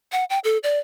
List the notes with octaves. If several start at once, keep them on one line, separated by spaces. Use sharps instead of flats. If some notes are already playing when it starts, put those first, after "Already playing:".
F#5
G5
A4
D5